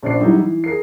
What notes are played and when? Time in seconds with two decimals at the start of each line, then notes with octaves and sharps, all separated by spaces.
0.03 A#1 C#4 D4 C5 D5 C7
0.21 F#3 G3 D#4 E4
0.34 E3
0.64 G#4 A#4 C7